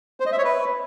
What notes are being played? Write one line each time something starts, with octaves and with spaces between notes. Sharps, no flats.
C5
D#5
E5
C#5
B4